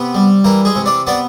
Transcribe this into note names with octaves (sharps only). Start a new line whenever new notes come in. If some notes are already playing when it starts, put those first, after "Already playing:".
Already playing: C3 B3 B4
G3
E3 A#3 A#4
G#3 G#4
C3
D4 D5
B3 D4 D5